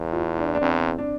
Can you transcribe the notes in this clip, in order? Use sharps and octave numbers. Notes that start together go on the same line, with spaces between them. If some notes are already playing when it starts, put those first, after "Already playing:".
Already playing: E2
F4
D4
D4
E2 C4
D4